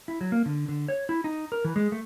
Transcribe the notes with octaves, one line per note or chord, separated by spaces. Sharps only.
E4
F#3
A#3
D3
D3
C#5
E4
D#4
A#4
E3
G#3
A3